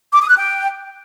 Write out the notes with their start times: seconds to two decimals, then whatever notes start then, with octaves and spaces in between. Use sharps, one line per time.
0.13 D6
0.21 D#6
0.29 F#6
0.37 G5